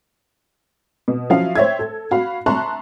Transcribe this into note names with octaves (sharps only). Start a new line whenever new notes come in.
B2
F3 F#3 C#4 E4 F5
C5 C#5 E5 G5 G#6
A4
F#4 F5 B5
E5 A5 A#5 C6 C#6 F#6